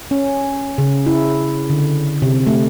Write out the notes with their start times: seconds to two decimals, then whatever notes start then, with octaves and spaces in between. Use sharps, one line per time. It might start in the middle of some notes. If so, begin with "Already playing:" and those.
0.11 C#4
0.78 C#3
1.06 E4
1.70 D3
2.22 C3
2.47 A3